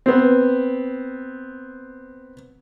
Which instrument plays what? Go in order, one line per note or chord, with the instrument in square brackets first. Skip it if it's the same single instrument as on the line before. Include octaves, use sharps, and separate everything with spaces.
[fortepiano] B3 C4